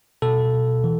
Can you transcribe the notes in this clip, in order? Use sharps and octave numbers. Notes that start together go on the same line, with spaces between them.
B2 A4
E3